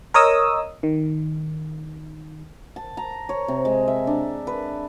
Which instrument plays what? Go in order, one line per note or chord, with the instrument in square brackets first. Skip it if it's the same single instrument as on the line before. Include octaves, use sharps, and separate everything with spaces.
[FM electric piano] A#4 C#5 D#5 D#6 E6
D#3
[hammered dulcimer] A5
A#5
C#5
C3
G#3
E5
D4
B4